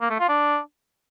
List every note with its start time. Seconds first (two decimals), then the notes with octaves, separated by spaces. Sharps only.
0.01 A#3
0.10 A3
0.19 F4
0.28 D4